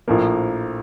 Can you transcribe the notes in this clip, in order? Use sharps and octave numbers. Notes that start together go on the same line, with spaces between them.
A#1 A2 F3 A#3